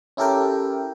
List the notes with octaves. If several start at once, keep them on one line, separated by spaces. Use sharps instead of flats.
C#4 E4 G4 A4 A#4 G5